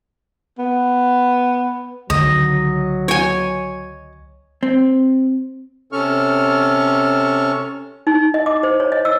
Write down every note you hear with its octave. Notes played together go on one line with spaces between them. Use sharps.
B3
C#2 D3 D#3 F#3 D#5
C#5 G#5
C4
C3 C#4 A4 C#6 F6
D#4
D#5
D6
C5
C#5
D#5
E6